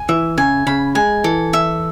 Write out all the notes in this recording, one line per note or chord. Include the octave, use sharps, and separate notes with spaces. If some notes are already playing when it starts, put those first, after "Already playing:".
Already playing: G#5
E3 E5
C#3 G#5
C#3 B5
G#3 G#5
E3 A4
E5